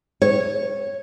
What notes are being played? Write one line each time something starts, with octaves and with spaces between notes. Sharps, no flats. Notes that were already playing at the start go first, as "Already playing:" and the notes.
C#5